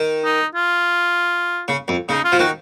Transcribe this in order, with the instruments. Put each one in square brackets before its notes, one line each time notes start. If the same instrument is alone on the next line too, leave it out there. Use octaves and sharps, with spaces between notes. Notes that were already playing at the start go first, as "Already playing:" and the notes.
Already playing: [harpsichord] D#3
[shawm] D#4
F4
[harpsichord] C#3
F2
[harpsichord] C#3 [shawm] D#4
[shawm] F4
[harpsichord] F3
[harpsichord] D#3 [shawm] F#4